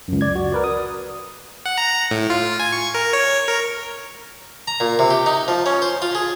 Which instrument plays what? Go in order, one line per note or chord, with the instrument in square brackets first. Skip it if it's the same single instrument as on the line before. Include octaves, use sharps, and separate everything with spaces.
[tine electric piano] C#2 F#2
D5 G#6
F#4
A#4 B4 D5
D#6
[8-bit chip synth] F#5
A#5
A2
F4
G#5
C#6
A#4
C#5
A#4
[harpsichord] A#5
A#2
C3
G4
D#4
F3
C#4
C5
F4
G#4